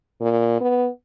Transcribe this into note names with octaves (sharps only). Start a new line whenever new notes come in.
A#2
B3